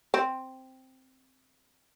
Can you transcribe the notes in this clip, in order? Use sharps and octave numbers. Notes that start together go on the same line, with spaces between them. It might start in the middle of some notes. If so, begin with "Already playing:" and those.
C4